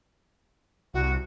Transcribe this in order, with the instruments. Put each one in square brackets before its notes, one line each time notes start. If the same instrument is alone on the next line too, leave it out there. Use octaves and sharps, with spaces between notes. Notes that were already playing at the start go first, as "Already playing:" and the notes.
[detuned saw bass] C2 [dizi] F#4